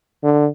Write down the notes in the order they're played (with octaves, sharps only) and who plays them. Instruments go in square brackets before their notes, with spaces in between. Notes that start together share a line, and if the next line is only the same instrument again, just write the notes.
[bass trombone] D3